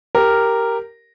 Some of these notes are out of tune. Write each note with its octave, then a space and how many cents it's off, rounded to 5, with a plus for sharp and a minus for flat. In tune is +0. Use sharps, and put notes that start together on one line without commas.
G4 +0 A#4 -5